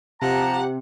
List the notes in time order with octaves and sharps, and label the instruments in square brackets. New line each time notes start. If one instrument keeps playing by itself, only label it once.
[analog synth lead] C3 [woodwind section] F3 A5 A#5 [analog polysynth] G4 [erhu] F#5